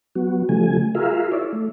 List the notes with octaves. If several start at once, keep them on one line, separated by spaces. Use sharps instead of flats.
F#3 B3 F#4
C#3 F3 G3 A3 G#5
F4 F#4 G#4 A#4 E5 F5
E4 C#5 D5 E5
A3